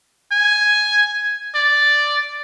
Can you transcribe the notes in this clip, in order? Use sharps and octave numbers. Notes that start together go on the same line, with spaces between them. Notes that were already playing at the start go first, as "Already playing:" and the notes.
G#5
D5